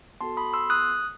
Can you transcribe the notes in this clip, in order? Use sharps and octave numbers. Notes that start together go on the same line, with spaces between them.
B3 F#4 A4 A5 C6
B5 D#6
C6 E6
D#6 F#6